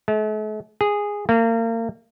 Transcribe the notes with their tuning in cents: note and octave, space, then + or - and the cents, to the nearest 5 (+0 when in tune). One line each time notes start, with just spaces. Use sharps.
A3 -45
G#4 -10
A#3 -35